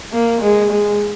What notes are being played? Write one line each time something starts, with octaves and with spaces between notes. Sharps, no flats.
A#3
G#3
G#3